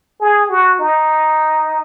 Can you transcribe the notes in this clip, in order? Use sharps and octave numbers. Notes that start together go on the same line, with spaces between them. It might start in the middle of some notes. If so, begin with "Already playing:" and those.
G#4
F#4
D#4